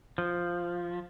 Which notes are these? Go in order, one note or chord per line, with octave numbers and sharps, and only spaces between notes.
F3